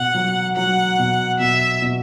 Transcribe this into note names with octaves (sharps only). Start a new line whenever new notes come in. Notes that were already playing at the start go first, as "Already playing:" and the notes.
Already playing: B2 F#5
F#3
F#3 F#5
B2
B2 E5
B2